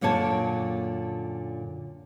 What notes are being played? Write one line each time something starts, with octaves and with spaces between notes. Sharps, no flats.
F#2 A#2 D3 C#5 A5